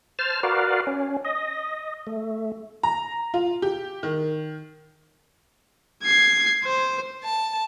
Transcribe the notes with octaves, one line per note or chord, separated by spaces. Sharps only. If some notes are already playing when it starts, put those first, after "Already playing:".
C5 A5 F6
F#4 A#4 B4 D5 F5
C#4
D#5
A3
A#5
F4
G4
D#3
G#6 C7
C5
A5